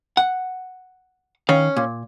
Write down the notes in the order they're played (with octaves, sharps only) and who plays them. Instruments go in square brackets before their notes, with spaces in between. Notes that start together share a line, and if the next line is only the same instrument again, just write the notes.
[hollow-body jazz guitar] F#5
[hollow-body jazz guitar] D#3 F5 [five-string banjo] C#4
[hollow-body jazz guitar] A#2